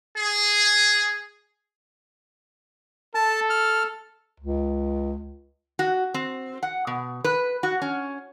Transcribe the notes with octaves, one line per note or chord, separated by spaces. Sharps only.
G#4
A4 A5
F6
C#2
F#4
C4
F#5
B2
B4
F#4
C#4